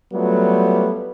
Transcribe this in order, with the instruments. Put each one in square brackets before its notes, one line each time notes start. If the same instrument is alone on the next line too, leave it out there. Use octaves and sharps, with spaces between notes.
[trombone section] F#3 G3 A3 B3 F4